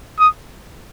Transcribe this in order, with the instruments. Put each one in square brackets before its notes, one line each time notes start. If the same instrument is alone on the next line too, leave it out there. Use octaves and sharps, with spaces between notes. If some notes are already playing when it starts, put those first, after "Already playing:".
[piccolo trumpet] D#6